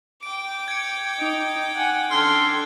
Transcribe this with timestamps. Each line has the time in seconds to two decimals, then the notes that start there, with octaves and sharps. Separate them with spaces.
0.23 G5 D6 D7
0.68 G#6 C#7
1.18 D#4
1.75 F#5 G#5
2.11 D4 A4 C6 F6 F#6 G#6